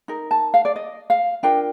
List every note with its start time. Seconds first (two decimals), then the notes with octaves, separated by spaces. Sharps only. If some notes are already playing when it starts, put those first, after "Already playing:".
0.08 D#4 A#4
0.31 A5
0.54 F5
0.65 D5
0.76 D#5
1.10 F5
1.43 D4 F4 A#4 G5